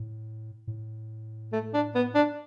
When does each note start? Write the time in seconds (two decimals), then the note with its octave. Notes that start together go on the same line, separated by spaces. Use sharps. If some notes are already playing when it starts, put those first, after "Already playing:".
Already playing: A2
0.67 A2
1.52 A3
1.74 D4
1.95 B3
2.15 D4